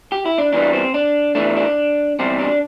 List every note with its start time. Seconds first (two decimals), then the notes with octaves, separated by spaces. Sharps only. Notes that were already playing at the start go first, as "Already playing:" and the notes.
0.12 G4
0.26 E4
0.38 D4
0.53 E2 E3 G3 D4
0.73 C4
0.94 D4
1.35 E2 E3 A3 D4
1.57 D4
2.19 E2 C3 G3 C4
2.39 D4